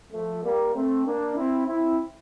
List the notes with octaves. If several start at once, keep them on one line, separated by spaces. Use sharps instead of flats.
F3 A3
G3 A#3
A3 C4
A#3 D4
C4 E4
C4 E4